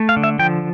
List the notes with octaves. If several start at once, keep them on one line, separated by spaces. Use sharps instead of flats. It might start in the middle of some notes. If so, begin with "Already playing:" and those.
Already playing: A3
F5
D3
E5
F3 G5